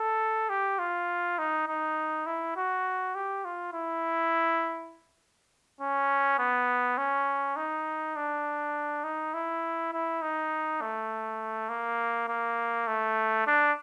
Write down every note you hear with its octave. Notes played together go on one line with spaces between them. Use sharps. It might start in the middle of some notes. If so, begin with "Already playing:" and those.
Already playing: A4
G4
F4
D#4
D#4
E4
F#4
G4
F4
E4
C#4
B3
C#4
D#4
D4
D#4
E4
E4
D#4
A3
A#3
A#3
A3
D4